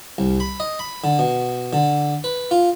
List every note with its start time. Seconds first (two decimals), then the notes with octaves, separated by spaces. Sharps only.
0.18 C2
0.40 B5
0.60 D#5
0.79 B5
1.04 D3
1.19 B2
1.73 D3
2.24 B4
2.51 F4